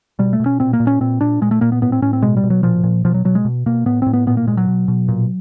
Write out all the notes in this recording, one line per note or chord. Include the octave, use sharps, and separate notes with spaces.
B2 G3
A3
B2
C#4
A#2 C4
A#3
A#2
C#4
A#2 C4
A#2 D4
A#2 G#3
A3
A#2 A#3
B3
A2 B3
C4
A2 C#4
C4
B2 G#3
G3
B2
F#3
A#2 F3
A#2
B2 F3
F#3
B2 F#3
G#3
B2
B2 A#3
A2 B3
A2 C4
B3
A#2 B3
A#3
A#2 G#3
F#3
B2
B2
A#2